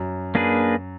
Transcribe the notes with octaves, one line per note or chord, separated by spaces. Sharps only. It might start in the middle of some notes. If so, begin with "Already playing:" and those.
Already playing: F#2
A#3 D4 G#4 B4